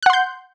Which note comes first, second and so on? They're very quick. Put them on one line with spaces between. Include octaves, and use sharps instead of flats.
F#6 F#5 C6 G6